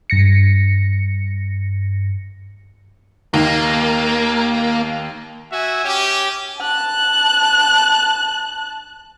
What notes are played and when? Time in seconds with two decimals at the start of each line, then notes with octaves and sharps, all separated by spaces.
0.10 G2 A#6 C#7
3.34 D#2 A#3
5.51 F#4 E5 G#5
5.85 C#4 G4
6.60 A5 F#6